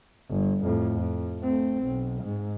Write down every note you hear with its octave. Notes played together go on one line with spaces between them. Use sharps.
G1
F2 A2
F2
A3 C4
B1
G#2